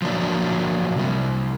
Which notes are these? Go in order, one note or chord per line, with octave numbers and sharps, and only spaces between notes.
F3 F#3 A#3 D4
C3 G3